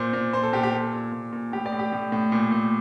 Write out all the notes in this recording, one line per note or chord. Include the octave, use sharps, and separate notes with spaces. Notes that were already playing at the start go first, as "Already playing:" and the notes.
Already playing: A#2 C5
A#2
A#2 C5
A4
A#2 G4
G4
A#2 A4
A#2
A#2
A#2
A2 G4
D5
A2
G4
A2
A2
A#2
A#2